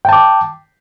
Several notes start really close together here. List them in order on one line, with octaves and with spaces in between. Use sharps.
G5 A5 D6